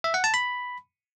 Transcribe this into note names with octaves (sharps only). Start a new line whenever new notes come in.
E5
F#5
A5
B5